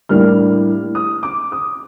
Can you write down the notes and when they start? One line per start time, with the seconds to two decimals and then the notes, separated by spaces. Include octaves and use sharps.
0.09 A2 G3 A#3 D4 F6
0.95 D#6
1.23 D6
1.52 D#6